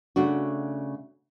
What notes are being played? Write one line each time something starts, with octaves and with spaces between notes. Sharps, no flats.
C#3 A3 D4 F#4